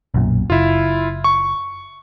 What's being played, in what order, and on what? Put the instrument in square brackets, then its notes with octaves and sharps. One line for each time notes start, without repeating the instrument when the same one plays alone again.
[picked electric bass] B1 F#2 A#2
[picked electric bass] F#1 [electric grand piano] E4 F4
[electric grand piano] C#6